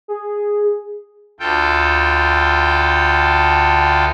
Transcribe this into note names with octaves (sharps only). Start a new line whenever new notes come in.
G#4
D2 F4 A4 G5